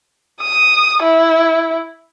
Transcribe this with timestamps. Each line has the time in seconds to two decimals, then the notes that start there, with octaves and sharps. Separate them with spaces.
0.41 D#6
1.03 E4